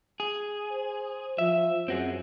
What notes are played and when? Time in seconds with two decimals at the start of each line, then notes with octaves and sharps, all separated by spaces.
0.20 G#4
0.72 C5
1.38 F3 E5
1.88 F#2 C4 F#4 G#4